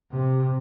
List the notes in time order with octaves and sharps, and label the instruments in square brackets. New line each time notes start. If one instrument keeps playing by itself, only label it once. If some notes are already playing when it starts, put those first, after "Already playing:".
[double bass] C3